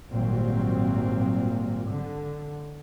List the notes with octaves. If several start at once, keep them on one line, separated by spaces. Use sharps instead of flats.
G#1 A#2 F#3 G3 C4
D3